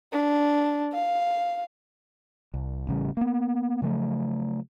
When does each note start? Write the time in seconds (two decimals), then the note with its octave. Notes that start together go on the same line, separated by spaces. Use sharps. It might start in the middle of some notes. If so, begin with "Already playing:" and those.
0.13 D4
0.93 F5
2.54 C2
2.87 A1 C#3 G3
3.17 A#3 B3
3.82 C#3 F3 F#3 A3